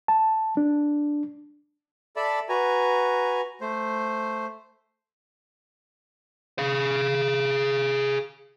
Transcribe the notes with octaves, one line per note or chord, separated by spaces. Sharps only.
A5
D4
A4 D5 E5 A5 B5
F#4 B4 G#5 A#5
A3 C5
G#4 F5